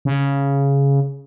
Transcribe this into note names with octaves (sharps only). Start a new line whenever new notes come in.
C#3